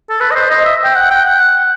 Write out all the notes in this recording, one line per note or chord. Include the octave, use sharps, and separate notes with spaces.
A4
B4
D#5
C5
D#5
E5
G5
F#5
G5
F#5